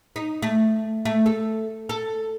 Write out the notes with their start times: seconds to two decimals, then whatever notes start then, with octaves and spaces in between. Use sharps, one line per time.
0.16 D#4
0.42 A3
1.05 A3
1.26 A4
1.89 A4